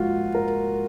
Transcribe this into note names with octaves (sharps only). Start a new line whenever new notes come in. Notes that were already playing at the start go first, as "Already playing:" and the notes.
Already playing: G#2 F3 A#3 F4 F#4
A#4